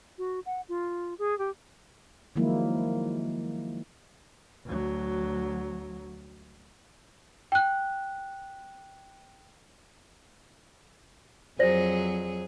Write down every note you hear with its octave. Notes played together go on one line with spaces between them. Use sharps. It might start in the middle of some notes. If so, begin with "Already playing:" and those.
F#4
F#5
F4
G#4
G4
D#3 F3 F#3 G#3 A#3 E4
D2 F#3
G5 F#6
F2 F#3 G#4 C5 D5 A#6